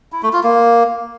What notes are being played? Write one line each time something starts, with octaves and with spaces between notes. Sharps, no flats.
E4
A3
F4
A#3